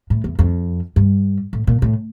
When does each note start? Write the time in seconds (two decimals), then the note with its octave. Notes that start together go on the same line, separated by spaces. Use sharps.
0.10 A2
0.24 E2
0.39 F2
0.96 G2
1.53 A2
1.67 A#2
1.82 A2